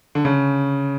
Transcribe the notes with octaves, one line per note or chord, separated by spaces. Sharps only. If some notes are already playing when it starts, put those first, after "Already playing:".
D3
C#3